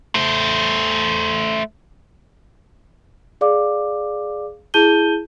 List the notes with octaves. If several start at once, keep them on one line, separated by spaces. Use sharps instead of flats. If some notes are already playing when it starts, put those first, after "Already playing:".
A3 C5
G#4 D5 F5 D6
E4 G#4 A5 G6 D#7 G7